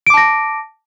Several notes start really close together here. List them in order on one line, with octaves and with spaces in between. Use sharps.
D7 D6 A5 A#6